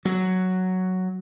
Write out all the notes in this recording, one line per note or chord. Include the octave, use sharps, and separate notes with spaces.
F#3